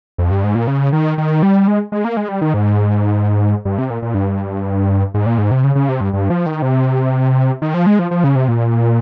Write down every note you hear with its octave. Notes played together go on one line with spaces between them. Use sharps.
F2
G2
G#2
A#2
C#3
D#3
D#3
G3
G#3
G#3
A#3
G#3
G3
D#3
G#2
G2
C3
A#2
A#2
G2
G#2
A#2
G#2
C3
C#3
C#3
C3
G2
G2
F3
D#3
C3
D#3
F3
G#3
F3
F3
C#3
C3
A#2